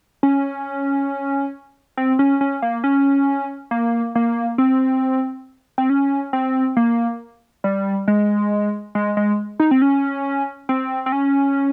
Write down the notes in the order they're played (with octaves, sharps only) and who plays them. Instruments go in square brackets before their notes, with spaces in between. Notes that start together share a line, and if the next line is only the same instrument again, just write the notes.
[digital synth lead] C#4
C4
C#4
C#4
A#3
C#4
A#3
A#3
C4
C4
C#4
C4
A#3
G3
G#3
G#3
G#3
D#4
C4
C#4
C4
C4
C#4